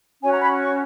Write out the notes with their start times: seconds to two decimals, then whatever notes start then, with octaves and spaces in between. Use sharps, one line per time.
0.22 C#4 F#4 C#5 G#5
0.33 A#5
0.42 B5
0.60 C#6